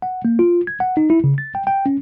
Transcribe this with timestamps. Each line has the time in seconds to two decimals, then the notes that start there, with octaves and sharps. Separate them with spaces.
0.02 F#5
0.25 A#3
0.39 F4
0.67 G#6
0.80 F#5
0.97 D#4
1.10 E4
1.24 C#3
1.38 A6
1.55 G5
1.67 G5
1.86 C#4